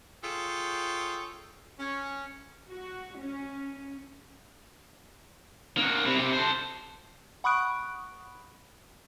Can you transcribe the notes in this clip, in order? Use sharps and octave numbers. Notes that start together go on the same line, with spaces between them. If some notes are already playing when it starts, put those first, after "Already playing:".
F4 G#4 A4 C#5 G5
C#4
F#4
C#4
A#3 F#4
C3 E4
C3 G4
A4 C5
F#5 B5 C#6 D#6 F#6 D7